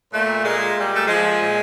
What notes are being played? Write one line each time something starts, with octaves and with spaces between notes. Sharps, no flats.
A#2 A3
A#2 G#3
A#2 G3
A3
F3 G#3
A#2